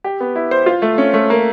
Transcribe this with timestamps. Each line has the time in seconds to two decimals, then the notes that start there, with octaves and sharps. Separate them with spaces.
0.04 G4
0.20 B3
0.36 E4
0.51 C5
0.66 F4
0.82 A3
0.98 C#4
1.14 A3
1.30 A#3